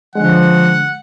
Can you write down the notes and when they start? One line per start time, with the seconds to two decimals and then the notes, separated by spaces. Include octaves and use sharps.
0.15 D3 F3 G#3 F#5